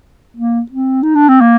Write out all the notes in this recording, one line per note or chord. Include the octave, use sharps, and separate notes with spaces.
A#3
C4
D#4
D4
C4
A#3